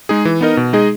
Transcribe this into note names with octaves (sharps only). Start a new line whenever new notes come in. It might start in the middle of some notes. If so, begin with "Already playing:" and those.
G#3 D#4 G#4
E3
B3 D#4 A#4 D#5
B2
G#3 D#4 G#4 D#5